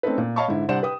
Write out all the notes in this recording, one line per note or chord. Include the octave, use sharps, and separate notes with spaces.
A3 C4 C#4 D#4 A4 B4
A#2
C#5 D#5 F5 A5 B5 C#6
G#2 D3 E4
C2 D4 C5 D5 F#5 E7
B4 G5 D#6